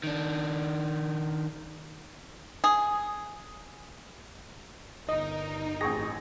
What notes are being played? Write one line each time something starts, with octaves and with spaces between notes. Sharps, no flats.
D#3 D4
G#4
G1 D#4 A#4 D#5
A1 C4 G#4 C#6 A#6